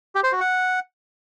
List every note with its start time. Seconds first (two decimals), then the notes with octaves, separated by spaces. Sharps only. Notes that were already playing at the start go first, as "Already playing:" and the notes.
0.15 G4
0.24 C5
0.32 F#4
0.40 F#5